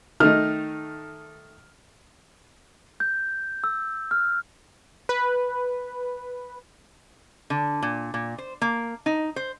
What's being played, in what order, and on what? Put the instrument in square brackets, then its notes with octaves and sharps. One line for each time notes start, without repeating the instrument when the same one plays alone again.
[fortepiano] D#3 A3 D#4 [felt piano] F6
[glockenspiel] G6
E6
F6
[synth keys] B4
[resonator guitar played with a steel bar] D3
A#2
A#2
C5
A#3
D#4
C5